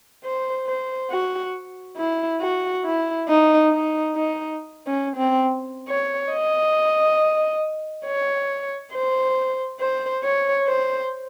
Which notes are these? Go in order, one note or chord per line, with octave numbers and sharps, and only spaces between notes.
C5
C5
F#4
E4
F#4
E4
D#4
D#4
D#4
C#4
C4
C#5
D#5
C#5
C5
C5
C#5
C5